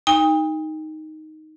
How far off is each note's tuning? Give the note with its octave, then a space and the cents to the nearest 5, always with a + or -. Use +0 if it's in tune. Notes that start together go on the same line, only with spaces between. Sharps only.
D#4 +0 G5 +45